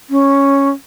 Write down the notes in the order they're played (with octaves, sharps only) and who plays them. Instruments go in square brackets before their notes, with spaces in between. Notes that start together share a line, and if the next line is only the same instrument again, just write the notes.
[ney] C#4